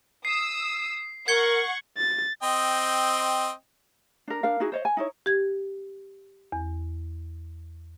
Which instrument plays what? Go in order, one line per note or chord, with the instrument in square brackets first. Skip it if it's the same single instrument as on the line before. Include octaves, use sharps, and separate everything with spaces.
[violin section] D#6 E6 [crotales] C7
[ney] A#4 [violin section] F#5 C#6 [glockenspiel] G#6 C#7 G7
[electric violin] A6
[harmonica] C4 D#5 G5
[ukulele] D4 A#4
D4 A#4 F5
D#4 E4 F#4 G#4
C5 C#5 D#5
G#5
D#4 E4 C#5
[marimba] G4 G#6
E2